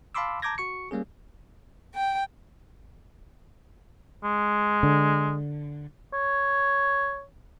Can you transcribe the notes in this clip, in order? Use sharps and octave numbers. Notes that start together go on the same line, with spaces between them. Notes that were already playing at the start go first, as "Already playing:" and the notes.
F5 A5 B5 C6 D6 E6
A5 A#5 D6 G6 G#6 A#6
F#4 C#6 C#7
G3 A#3 C#4 G#4
G5
G#3
D3
C#5